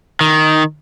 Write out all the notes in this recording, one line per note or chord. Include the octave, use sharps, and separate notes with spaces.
D#3